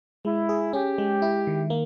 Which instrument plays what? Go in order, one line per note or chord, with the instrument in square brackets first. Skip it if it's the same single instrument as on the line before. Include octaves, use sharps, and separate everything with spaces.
[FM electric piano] G#3 [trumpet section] E4
[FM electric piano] G#4
[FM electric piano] C#4 [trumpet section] G4
[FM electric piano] G#3
E4
D#3
A#3